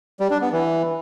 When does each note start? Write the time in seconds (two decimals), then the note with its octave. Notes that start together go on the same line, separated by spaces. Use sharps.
0.20 G3
0.31 D4
0.41 B3
0.52 E3